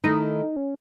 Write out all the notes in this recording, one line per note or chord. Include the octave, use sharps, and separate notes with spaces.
D#3 A3 D#4 E4
C#4